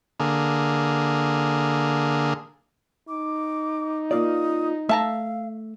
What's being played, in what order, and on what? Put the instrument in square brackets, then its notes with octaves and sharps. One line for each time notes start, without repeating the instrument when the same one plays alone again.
[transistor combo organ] D3 A#3 G#4
[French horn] D#4 [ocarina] D6
[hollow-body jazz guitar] A#3 F4 D5 [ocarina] D#6
[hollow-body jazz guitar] A3 [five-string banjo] E5 A5 A#5 [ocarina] F5